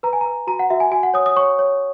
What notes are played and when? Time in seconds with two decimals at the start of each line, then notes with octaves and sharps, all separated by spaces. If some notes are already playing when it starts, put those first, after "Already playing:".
0.03 B4 A#5
0.13 G#5
0.21 B4 A#5
0.47 F#4 A#5
0.59 F#5
0.70 F#4 E5
0.80 G#5
0.91 F#4 G#5
1.03 F#5
1.14 C#5 D#6
1.26 D#6
1.36 C#5 C#6
1.59 C#5